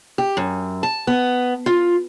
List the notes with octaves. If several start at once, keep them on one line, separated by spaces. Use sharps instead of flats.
G4
F#2
A5
B3
F4